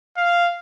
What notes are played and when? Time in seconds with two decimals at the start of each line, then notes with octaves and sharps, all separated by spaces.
0.18 F5